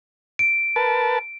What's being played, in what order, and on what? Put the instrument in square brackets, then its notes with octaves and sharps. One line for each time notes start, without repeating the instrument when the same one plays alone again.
[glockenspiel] D7
[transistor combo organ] A#4 B4 A5